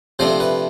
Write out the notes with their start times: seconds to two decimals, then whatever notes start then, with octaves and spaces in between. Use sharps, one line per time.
0.19 C3 F3 A3 D4 C5
0.40 B4